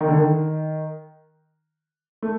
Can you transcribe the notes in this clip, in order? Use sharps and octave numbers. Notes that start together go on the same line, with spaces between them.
D#3
D3
D#3
A3